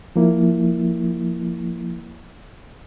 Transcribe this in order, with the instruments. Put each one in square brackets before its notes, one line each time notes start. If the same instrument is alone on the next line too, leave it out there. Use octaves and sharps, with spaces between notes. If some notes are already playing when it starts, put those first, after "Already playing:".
[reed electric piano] F3 A#3 E4